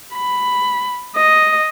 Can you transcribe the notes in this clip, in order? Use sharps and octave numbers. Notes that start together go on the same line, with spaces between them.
B5
D#5